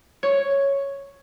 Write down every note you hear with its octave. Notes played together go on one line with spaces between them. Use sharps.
C#5